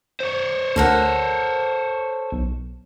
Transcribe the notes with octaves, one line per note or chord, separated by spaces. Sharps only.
C5 C#5
D2 A4 A#4 F#5
B1